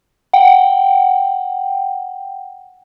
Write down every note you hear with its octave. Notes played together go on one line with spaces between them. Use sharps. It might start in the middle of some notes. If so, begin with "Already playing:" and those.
F#5 G5